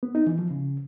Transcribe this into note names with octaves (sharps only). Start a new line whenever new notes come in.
B3
D#4
E3
F3
C#3